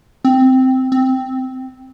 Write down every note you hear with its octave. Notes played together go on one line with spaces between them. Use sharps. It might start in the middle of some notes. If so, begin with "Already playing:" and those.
C4
C4